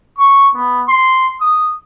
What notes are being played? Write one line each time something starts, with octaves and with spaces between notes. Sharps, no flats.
C#6
B3
C6
D#6